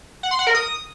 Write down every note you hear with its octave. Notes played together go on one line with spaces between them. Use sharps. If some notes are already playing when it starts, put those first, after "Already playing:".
F#5
C6
F#5
A#4
D#6